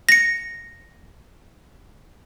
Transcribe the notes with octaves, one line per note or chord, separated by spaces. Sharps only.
A#6 C#7